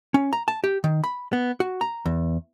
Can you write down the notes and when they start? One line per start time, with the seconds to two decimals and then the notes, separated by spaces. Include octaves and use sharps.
0.14 C#4
0.33 A#5
0.48 A5
0.64 G4
0.84 D#3
1.04 B5
1.33 B3
1.60 F#4
1.81 A#5
2.06 E2